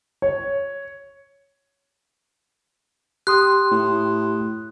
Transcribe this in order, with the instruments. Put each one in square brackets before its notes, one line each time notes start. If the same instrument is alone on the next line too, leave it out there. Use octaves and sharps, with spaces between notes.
[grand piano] C#5
[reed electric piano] G4 C6 D#6 [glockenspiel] F#6
[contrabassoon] A2